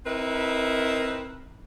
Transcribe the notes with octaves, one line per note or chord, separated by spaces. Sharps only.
C4 D#4 E4 A#4 B4